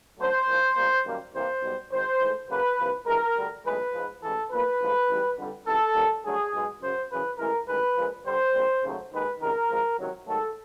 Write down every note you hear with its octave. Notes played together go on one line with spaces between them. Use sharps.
F#2 D3 F#3 A3 C5
C2 A#2 F3
B1 A#2 G3 A#3
F#2 D#3 G3 A#3
C2 C3 E3 G3 A#3 C5
B1 B2 G3
G#1 G#2 D#3 C5
G#2 E3 A3
F#2 C#3 F#3 A#3 B4
C2 C3 F3 A#3
G2 E3 G#3 A#4
D2 D3 G3
B1 A2 E3 G#3 B4
G#2 F3 G#3
A1 G#2 E3 A4
B1 A#2 F3 A#3 B4
A1 G#2 F3 A3
A1 G#2 E3 G3
F2 D3 G3
C#2 C3 E3 A4
D#2 D#3 G3 A#3
G2 D3 F#3 A3 G#4
B1 B2 G#3
F#2 C#3 F#3 C5
F#2 C#3 E3 B4
A1 A2 E3 G#3 A#4
A1 G2 D#3 G#3 B4
A#1 A#2 F3 G#3
G2 D3 G3 C5
A#1 A#2 G3
D#2 C#3 F#3 A3
D#2 D#3 G#3 B4
C#2 C3 D#3 A#4
G#1 G#2 F3
C#2 C3 D#3 F#3
G#2 D#3 F#3 A3 A4